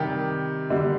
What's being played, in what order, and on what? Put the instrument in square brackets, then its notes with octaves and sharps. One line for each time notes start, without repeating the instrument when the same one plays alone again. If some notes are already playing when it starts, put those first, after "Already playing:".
Already playing: [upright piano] C3 D#3 G3 G4
D3 G3